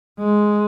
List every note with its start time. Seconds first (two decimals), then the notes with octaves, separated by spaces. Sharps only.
0.20 G#3